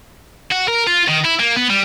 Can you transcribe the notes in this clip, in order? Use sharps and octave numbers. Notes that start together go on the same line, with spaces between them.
F#4
A#4
F4
D#3
E4
A#3
B3
G3